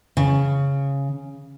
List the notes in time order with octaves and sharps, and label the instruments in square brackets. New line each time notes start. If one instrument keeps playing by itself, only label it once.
[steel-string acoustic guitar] C#3